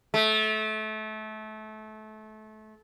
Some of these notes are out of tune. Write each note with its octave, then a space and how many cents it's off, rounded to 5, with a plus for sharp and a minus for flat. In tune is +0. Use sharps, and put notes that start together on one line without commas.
A3 -25